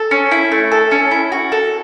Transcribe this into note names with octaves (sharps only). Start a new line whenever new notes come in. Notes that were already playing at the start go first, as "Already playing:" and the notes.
Already playing: A4
C#4
E4
A3
A4
C#4
E4
F#4
A4